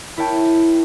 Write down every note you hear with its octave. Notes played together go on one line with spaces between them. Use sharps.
E4 A#4 C#5 G5 A5